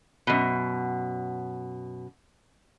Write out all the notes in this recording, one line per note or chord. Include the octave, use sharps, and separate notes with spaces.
F#2 B2